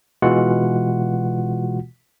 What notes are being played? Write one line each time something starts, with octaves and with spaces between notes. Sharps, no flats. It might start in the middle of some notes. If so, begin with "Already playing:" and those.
B2 E3 G#3 F4 F#4 F#5